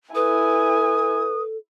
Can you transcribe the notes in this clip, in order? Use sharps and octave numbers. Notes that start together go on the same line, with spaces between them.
E4 A4 B4 G#5 D#6